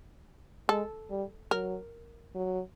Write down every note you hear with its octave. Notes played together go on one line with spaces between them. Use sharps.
G#3 A4
G3
F#3 A#4
F#3